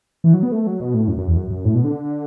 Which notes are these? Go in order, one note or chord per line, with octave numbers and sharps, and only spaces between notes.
E3
F#3
B3
A3
F#3
B2
A2
F#2
F#2
E2
F#2
F#2
A2
B2
D3